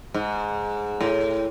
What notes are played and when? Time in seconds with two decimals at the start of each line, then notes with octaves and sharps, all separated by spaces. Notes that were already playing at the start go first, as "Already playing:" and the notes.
0.14 G#2
1.01 A2